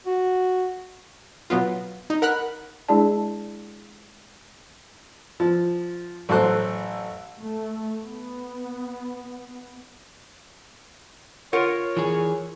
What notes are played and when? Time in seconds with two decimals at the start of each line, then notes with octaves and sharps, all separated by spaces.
0.06 F#4
1.50 B2 F#3 B3 F4
2.10 D#4
2.22 A#4 F#5 B5 F6 F#6
2.89 G#3 D4 E4 G#4 D5 A5
5.40 F3
6.29 A1 F#3 A4 C5 C6 F#6
7.40 A3
8.04 B3
11.53 F4 A#4 C#5 F#5
11.97 E3 G#4